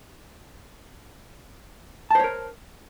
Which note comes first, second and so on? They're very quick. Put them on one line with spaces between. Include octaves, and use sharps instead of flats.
A5 C5 C#5 A#4